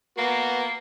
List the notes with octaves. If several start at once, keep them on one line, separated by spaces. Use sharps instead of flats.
A#3 B3 F#4